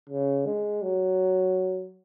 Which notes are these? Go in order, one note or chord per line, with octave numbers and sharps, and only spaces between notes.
C#3
G#3
F#3